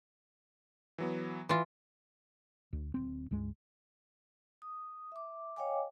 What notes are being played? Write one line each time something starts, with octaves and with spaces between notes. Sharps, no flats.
E3 F#3 B3
E3 F4
D2
D1 C4
C#2 G2 G#3
D#6
E5 D6
C#5 D#5 F5 G5 G#5 D6